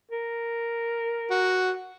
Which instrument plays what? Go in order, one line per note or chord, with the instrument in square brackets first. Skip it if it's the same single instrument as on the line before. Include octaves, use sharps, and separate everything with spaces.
[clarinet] A#4
[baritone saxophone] F#4